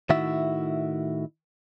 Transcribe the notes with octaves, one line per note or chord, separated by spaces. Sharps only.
A2 D#3 E4 F#4 E5